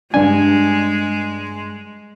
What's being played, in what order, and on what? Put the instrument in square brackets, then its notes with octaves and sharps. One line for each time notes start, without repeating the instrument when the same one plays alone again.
[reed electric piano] G2 G#5 [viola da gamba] G#3 [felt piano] D4